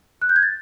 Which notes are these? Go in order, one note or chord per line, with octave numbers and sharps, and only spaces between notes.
F#6
G6
G#6
A6